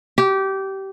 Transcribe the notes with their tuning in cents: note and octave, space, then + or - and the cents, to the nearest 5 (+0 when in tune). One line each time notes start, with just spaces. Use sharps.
G4 -20